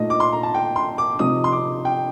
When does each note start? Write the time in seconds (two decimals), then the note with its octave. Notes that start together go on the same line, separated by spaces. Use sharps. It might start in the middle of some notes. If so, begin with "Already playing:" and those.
Already playing: A#2 A3 D#4 D#5
0.10 D6
0.20 C6
0.33 A#5
0.43 A5
0.55 G5
0.76 C6
0.98 D6
1.19 C3 F3 C4 D#4 D#6
1.44 C6
1.52 D6
1.85 G5